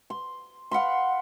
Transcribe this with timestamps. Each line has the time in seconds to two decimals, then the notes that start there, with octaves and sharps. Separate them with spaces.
0.10 C6
0.71 F5 F#5 B5 C6